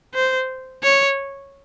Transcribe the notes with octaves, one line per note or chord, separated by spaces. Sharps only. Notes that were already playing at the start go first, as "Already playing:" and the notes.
C5
C#5